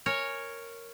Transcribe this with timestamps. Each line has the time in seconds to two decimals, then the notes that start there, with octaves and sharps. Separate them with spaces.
0.06 A#4 C#5 G#5